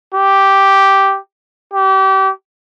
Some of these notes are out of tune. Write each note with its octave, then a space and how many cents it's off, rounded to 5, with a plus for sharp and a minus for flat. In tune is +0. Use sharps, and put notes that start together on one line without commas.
G4 -5
G4 -30